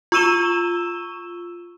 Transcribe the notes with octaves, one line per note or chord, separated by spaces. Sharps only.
F4 C#6 E6 D#7 E7 G7